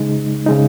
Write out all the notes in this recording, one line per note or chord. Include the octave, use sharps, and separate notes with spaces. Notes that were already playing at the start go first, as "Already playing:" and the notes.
Already playing: C#3 G#3 D#4
C#3 G#3 D#4